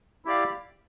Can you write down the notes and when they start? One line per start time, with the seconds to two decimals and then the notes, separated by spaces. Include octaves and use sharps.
0.25 E4 G4 D5 F5